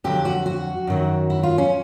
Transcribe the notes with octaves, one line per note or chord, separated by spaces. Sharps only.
F2 D3 F#3 G4
F#4
F#4
F#2 D#3 F#3
E4
F4
C#4